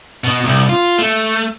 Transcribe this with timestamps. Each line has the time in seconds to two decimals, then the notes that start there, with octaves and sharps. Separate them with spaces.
0.24 B2
0.44 C2
0.69 F4
0.98 A3